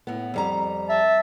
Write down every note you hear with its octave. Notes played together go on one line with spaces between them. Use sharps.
A2 B3
F2 G3 A#5
E5 A5